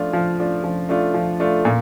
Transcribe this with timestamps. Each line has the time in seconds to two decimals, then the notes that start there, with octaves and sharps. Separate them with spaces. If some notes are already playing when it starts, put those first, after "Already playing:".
Already playing: F3 A3 D4 F4
0.13 F3
0.39 A3 D4 F4
0.64 F3
0.89 A3 D4 F4
1.14 F3
1.40 A3 D4 F4
1.65 A#2